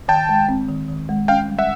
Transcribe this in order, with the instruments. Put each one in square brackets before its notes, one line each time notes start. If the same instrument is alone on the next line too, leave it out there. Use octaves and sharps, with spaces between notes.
[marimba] D#3 [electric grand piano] G5 A5
[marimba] G#3
C4
D#3
D#3
G#3
[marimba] C#4 [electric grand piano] F5 G5
[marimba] G3
[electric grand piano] E5 F#5